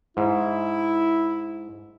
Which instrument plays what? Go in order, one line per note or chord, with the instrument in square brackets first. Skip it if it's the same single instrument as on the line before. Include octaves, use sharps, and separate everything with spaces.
[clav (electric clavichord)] G#2 [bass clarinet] E4